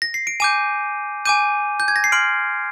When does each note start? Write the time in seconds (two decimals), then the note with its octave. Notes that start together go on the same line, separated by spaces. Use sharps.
0.02 A#6
0.14 C7
0.27 D7
0.40 G#5 D6 G6 D#7
1.25 G#5 D6 G6 D#7
1.80 G6
1.88 G#6
1.96 A#6
2.04 C7
2.12 C6 F6 D7